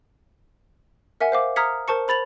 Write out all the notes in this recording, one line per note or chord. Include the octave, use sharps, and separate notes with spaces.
A#4 E5 F#5 G#5
C5 F5 D6
A#5 D#6 F6 G#6 B6 C#7
A#4 C5 A5 C#6 C#7
C5 B5 A6 F7 F#7